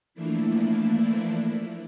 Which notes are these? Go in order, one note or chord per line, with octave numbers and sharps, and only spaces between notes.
E3 F3 A3 A#3 D4 E4